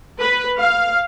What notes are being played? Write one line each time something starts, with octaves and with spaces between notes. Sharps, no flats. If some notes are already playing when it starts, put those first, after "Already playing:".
B4
F5